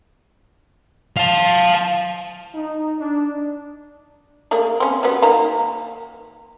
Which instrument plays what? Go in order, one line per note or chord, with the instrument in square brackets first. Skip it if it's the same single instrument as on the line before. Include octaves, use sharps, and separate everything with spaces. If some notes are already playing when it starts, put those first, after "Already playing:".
[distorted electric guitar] F5 A5
[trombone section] D#4
D4
[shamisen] A3 A#3 G#4
C4 C#4
F#3 G3 B3
D#3 A#3 A#5